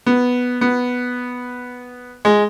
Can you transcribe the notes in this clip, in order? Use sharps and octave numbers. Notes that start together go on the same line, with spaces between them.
B3
B3
G#3